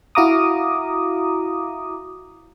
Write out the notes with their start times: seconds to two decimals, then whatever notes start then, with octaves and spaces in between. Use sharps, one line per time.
0.15 E4 F#4 F5 A#5 D6 D#6